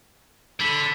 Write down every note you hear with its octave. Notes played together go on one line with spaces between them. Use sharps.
D3 B5